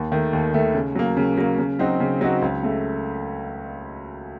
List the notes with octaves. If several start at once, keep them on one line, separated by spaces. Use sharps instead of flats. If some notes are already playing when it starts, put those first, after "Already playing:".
Already playing: D#2
D#3 A3
D#2
D#3 A3
C#3
F#3 A#3
C#3
F#3 A#3
C#3
F#3 C4 D#4 F#4
C#3
F#3 C4 D#4 F#4
C#2
C#3 A3